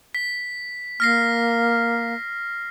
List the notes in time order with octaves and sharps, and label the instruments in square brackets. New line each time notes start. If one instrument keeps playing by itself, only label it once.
[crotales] B6
[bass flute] A#3 [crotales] F6 A#6 C7